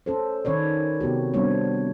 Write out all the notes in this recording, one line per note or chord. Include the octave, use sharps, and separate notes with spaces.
C#4 A4 C5
D#3 C#4 B4 C#5 D5
C3 B3 F#4 G4
G3 B3 C4 D4 C#5